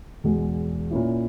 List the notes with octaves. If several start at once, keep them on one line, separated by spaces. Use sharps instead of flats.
E2 B2 G#3
A#2 A#3 C#4 E4